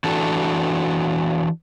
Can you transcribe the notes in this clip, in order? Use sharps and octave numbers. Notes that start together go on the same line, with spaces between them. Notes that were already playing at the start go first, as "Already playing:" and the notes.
E3 D4 F#4 A4